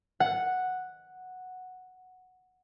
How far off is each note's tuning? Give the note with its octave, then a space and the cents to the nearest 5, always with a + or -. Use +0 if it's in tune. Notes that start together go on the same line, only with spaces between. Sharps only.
F#5 -5